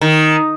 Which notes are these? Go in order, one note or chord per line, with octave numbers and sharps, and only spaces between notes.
D#3